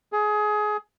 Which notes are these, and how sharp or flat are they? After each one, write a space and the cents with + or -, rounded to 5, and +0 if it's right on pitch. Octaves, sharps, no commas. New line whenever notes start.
G#4 +20